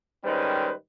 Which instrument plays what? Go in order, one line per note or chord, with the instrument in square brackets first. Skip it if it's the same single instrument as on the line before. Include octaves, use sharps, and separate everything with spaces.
[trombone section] G#2 D#3 G3 C#4 B4 C5